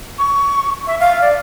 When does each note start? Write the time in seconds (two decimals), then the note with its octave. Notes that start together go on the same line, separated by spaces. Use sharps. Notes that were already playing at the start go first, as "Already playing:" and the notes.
0.18 C#6
0.87 E5
1.00 F5
1.21 D5